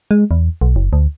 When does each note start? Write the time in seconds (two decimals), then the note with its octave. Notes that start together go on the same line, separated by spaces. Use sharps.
0.11 G#3
0.31 E2
0.61 B1
0.76 F#1
0.93 D2